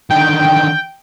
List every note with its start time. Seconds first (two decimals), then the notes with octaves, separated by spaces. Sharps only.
0.10 D3 D#3 G5